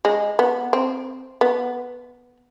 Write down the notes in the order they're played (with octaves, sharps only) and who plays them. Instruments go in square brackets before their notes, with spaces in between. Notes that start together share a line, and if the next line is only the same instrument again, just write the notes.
[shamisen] G#3
B3
C4
B3